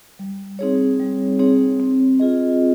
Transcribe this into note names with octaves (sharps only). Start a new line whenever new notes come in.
G3
C4 D#4 G#4 C#5
G3
C4 D#4 G#4 C#5
C4
F4 G#4 D#5